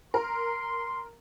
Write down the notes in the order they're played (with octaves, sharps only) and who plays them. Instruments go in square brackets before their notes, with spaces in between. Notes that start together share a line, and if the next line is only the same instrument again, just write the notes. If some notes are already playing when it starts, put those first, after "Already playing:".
[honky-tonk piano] A#4 [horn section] C6